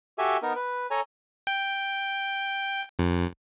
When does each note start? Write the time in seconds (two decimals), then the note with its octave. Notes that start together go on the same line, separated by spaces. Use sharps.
0.18 F#4 G4 A4 E5 G#5
0.42 B3 D#4 A#4
0.55 B4
0.91 A4 C#5 G#5 A#5
1.47 G5
2.99 F2